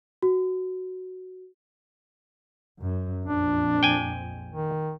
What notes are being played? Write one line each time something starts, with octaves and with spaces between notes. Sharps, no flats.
F#4
F#2
A#1 F2 D4
G5 G#5
D#3